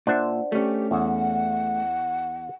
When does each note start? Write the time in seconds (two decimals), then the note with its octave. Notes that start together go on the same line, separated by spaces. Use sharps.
0.07 A#2 D4 C5 E5 F#5
0.52 A3 C#4 G4
0.91 E2 F#5